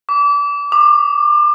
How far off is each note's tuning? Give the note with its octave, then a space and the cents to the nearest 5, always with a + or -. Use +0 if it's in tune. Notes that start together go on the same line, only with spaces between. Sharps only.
D6 -30
D6 +30